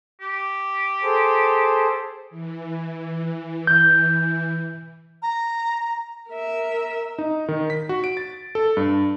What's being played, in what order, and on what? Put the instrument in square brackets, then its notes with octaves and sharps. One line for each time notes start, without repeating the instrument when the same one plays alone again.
[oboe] G4
[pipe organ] G#4 A4 C5
[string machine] E3
[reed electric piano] G6
[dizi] A#5
[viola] A#4 E5
[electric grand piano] D#4
D#3
B6
F#4
D7
A6
A4
G2